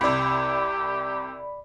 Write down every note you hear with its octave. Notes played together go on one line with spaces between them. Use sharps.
C2 C3 G4 D5 B5